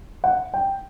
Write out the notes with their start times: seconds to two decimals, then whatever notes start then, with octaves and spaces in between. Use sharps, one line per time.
0.24 F#5
0.54 G5